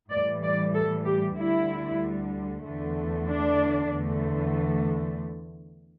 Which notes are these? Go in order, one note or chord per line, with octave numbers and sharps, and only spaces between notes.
A2 E3 G3 D5
D5
A4
G4
D2 D3 G3 E4
E2 D3 A3
D4
E2 D3 A3